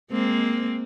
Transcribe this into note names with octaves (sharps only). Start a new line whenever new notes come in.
G#3 A#3 C4